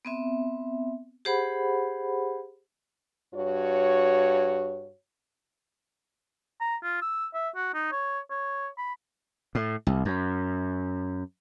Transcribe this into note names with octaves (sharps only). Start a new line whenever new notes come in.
B3 C4 E5
G4 G#4 C5 F#5 B5
G2 F#4 C#5
A#5
F4
E6
E5
F#4
D#4
C#5
C#5
B5
A2
C2
F#2